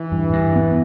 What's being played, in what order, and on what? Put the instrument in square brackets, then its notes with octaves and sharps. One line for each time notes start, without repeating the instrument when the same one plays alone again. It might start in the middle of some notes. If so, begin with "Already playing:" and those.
Already playing: [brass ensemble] E3
[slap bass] G2
G2
B3